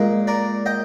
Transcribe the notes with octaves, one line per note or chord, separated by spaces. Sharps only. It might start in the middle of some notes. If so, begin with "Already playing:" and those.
Already playing: A#2 G#3
A#4 D5
D#5 G5